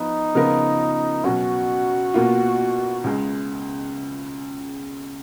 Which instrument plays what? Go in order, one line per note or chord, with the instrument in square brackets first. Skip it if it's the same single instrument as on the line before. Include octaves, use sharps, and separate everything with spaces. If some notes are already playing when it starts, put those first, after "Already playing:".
Already playing: [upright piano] F3 B3 F4 B4 [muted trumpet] D#4
[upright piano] C#3 F3 B3 F4 A#4
[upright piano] B2 F#3 C#4 [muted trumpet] F#4
[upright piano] B2 A#3 F4
C#2 C#3 G#3